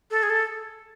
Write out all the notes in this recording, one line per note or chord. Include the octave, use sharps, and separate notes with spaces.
A4
G#4
A4